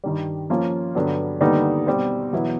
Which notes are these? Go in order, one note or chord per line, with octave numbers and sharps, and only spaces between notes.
G2 D#3 G3
F3 A#3 C#4 F4
G2 D3 F#3 B3
D#2 D3 G3 B3 D#4
B2 G3 C4
E2 B2 F#3 B3 E4